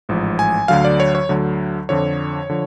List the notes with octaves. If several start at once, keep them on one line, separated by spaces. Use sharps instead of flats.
A1 G#2 F3
G#5
D2 D3 F#3 F5
D5
C#5
C#5
D2 D3 F#3
F2 D3 F3 C#5
D3 F3